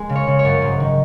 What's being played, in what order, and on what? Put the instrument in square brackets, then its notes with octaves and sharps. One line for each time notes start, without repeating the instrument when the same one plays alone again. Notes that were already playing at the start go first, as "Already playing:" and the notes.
Already playing: [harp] G#3
C#3
C#5
C#3
C#5
F#2
G#2
D#3